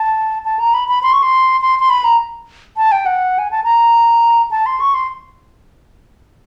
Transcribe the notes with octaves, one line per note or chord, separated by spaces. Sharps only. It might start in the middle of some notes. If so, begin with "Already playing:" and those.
Already playing: A5
A5
A#5
B5
B5
C6
C#6
C6
C6
C6
B5
A#5
A5
G5
F#5
G#5
A5
A#5
A5
C6
C#6
C6